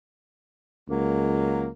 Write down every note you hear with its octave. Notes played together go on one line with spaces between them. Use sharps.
C#2 F#3 G#3 A#3